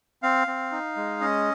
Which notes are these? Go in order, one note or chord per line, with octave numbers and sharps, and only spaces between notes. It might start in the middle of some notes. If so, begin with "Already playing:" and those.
C4 F5
C4
D#4
G#3
C#4 D#5